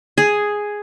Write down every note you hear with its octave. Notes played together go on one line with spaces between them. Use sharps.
G#4